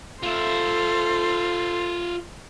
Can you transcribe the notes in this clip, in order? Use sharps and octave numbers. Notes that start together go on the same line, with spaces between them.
F4 A4 C5 E5